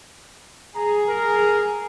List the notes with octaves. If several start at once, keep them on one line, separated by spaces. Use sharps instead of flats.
G#4 A#5
A#4